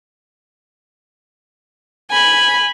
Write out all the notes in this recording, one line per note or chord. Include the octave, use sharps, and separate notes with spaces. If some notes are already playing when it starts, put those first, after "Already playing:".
G#5 B5